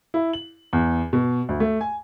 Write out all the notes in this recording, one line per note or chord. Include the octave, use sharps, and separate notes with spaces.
E4
F#7
E2
B2
D2
A3
G#5